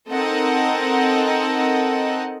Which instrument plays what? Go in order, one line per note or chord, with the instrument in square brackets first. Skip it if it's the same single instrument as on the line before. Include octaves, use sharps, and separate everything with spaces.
[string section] C4 D#4 A4 A#4 D#5 F#5